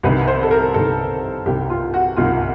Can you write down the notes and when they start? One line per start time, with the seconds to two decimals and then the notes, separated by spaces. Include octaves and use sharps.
0.03 C2 C3 D#3 B4
0.28 C5
0.43 A4
0.51 A#4
0.74 C2 C3 D#3 A4
1.46 C2 C3 D#3 G4
1.70 F4
1.94 F#4
2.16 C2 C3 D#3 F4